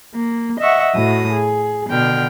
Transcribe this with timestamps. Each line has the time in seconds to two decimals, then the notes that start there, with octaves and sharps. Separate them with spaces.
0.14 A#3
0.59 D#5 E5 F#5 C#6
0.96 A2 F#4 D#6
1.32 G#4
1.89 B2 D3 G5 F6